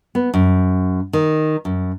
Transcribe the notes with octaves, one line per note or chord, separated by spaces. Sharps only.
B3
F#2
D#3
F#2